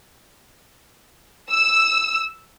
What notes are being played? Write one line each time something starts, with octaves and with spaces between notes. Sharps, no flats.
E6